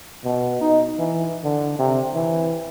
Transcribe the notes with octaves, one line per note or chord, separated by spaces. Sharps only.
B2
D#4
E3
D3
C3
E3